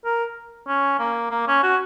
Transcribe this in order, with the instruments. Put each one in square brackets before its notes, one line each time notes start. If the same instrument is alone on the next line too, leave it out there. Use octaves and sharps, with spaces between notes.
[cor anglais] A#4
C#4
A#3
A#3
C#4
F#4